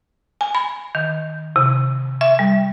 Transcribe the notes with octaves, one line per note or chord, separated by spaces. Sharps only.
G#5
B5
D#3
C3
E5
G3